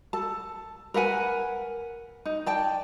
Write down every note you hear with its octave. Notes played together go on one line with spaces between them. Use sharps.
A4 A5
A#4 B4 F#5 G#5
D#4
D5 G5 A5